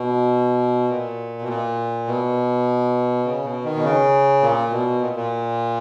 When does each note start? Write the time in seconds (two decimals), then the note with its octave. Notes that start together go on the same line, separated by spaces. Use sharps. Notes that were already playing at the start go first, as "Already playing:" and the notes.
Already playing: B2
0.90 A#2
1.41 B2
1.49 A#2
2.07 B2
3.25 C#3
3.44 B2
3.64 D#3
3.75 B2
3.83 C#3
4.42 A#2
4.72 B2
5.01 A#2
5.16 A#2